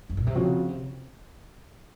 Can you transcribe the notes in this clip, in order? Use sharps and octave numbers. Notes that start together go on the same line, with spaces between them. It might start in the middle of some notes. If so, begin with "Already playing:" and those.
F#2
A#2
C3
C#3 F3 C4 F#4
C3